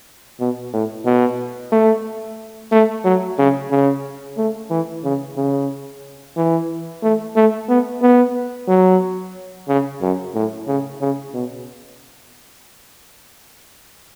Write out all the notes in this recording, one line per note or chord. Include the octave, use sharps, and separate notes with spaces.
B2
A2
B2
A3
A3
F#3
C#3
C#3
A3
E3
C#3
C#3
E3
A3
A3
B3
B3
F#3
C#3
F#2
A2
C#3
C#3
B2